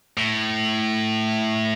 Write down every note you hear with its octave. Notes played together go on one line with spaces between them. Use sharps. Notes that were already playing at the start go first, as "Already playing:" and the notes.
A2